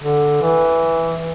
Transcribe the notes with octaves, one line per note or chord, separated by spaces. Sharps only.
D3
E3